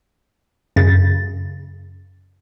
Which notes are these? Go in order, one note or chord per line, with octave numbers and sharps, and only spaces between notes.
F#2 C#3 A6